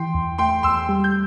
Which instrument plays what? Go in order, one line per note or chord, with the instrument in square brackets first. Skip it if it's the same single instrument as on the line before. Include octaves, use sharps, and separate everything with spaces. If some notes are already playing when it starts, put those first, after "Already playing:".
Already playing: [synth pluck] E3 [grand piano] G5 C6
[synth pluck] E2
[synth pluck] A3 [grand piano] G5 C6
[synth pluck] E2 [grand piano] C6 E6
[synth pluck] G3
[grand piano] G6